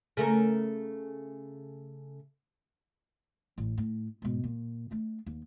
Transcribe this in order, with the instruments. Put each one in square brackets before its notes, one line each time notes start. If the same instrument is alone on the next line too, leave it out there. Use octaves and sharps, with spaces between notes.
[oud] C#3 A3 A#4
[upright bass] A1
A2
G#2 B2
A#2
A3 D4
D#2